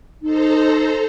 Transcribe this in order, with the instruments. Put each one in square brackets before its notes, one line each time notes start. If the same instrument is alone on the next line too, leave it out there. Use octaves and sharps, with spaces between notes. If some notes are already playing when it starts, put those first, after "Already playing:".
[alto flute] D#4 [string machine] A4 C5 A#5